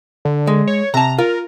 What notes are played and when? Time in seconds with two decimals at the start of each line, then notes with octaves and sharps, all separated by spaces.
0.25 D3
0.47 G#3
0.68 C#5
0.94 C3 A5 A#5
1.19 F4 A#4